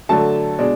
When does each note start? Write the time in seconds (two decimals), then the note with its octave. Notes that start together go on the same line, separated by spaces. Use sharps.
0.09 D3 F#3 A3 A5
0.59 B2 G#3 D4